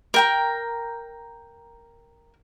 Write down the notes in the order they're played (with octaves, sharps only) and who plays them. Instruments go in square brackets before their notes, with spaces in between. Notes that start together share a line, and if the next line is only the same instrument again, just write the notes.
[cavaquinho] A#4 G5 A#5